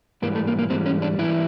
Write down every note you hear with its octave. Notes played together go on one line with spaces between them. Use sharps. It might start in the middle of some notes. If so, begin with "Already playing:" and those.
G#2 E3 G3 A#3
A3
A#3
A#3
G#2 E3 G3 C4
C#4
D4
G#2 E3 G3 E4